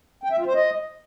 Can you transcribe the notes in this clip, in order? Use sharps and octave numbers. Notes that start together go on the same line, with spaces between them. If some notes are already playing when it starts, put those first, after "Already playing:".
G5
E5
F4
C5
D#5